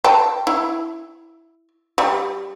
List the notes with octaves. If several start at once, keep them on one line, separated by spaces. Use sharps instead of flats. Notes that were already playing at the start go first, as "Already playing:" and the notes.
G5 A5
E4
G3